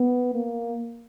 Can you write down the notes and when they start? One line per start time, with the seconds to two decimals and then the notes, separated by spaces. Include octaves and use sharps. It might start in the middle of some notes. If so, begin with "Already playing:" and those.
Already playing: B3
0.34 A#3